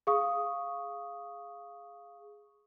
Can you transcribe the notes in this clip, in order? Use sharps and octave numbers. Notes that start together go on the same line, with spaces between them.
G#4 F5 C#6 D#6